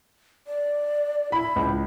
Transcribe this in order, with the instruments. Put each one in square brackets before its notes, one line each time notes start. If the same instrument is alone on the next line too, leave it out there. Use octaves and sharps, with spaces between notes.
[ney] D5
[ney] E4 [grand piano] B5
[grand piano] C#2